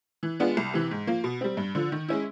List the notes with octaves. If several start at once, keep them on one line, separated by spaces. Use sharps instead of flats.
E3
G#3 B3 D4 F4
C2
C3 E3
G#2
F3 A#3
B2
G3 C4
G2
D3 F3
D#3
G#3 C#4 E4